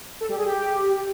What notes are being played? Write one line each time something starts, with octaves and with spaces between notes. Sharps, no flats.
A4
G3
G#4
G4